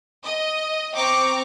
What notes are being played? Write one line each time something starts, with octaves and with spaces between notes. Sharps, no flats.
D#5
C4 G5 A#5 C#6 D6